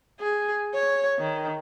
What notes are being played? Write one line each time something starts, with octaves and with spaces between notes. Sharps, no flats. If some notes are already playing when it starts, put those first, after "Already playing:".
G#4
C#5
D#3